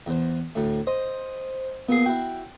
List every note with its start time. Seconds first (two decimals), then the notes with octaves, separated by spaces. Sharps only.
0.06 E2 C5
0.55 D2 A2
0.87 C5 D#5
1.89 A#2 B3 G#4 C7
2.06 E4 F#4 G5